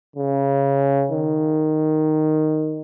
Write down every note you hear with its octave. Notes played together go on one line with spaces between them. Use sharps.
C#3
D#3